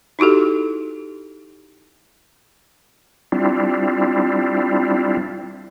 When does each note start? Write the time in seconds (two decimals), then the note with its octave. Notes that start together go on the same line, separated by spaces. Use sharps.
0.19 D#4 E4 F#4 G4 A4
3.32 G3 C4 D4 E4 F4